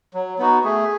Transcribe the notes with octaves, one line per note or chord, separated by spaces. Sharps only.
F#3
B3 D#4 F#4
A3 G#4